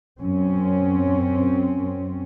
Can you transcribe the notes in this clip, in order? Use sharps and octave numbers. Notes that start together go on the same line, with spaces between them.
F#2 C4 C#4